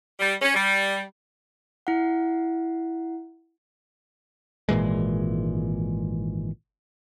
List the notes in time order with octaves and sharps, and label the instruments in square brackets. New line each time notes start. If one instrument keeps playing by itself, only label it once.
[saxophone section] G3
C#4
G3
[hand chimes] E4 F#5
[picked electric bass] G#1 A#2 E3 G#3